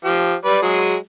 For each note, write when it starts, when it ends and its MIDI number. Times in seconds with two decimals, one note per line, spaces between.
0.05 0.34 53
0.05 0.34 67
0.45 0.62 55
0.45 0.62 71
0.45 0.62 74
0.62 0.96 54
0.62 0.96 56
0.62 0.96 68